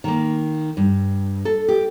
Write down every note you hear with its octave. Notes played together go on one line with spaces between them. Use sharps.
D#3 A#3
G2
A4
G4